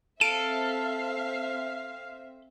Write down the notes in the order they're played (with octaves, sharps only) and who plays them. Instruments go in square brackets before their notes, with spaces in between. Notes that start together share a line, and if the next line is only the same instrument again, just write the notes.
[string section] C4 E5 [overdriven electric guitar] A4 [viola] F5 [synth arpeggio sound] D7